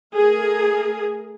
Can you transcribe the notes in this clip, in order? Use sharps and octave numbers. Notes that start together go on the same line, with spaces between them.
A3 G#4 A#4